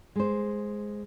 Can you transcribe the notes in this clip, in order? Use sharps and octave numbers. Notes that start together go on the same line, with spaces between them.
G#3 C5